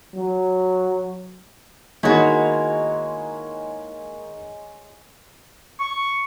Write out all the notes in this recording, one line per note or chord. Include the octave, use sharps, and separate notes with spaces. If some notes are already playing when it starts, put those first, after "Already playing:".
F#3
D#3 G#3 A#3 E4 F#4 G#4 A#4 C#5
C#6